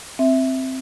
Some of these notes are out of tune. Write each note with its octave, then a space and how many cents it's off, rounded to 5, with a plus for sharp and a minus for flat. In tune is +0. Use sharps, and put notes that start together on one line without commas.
C4 +0 E5 -5